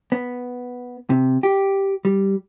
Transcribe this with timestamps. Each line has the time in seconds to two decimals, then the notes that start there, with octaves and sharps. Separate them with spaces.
0.12 B3
1.10 C3
1.43 G4
2.05 G3